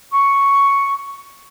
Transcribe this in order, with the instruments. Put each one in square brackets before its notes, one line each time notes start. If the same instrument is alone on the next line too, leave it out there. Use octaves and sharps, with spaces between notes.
[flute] C#6